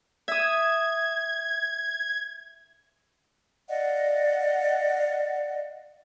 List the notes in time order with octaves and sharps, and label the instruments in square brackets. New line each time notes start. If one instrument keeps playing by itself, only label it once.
[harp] E5 D#6 [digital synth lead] G#6
[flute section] D5 D#5 F5 F#5